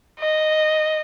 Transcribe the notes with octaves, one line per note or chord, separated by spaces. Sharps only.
D#5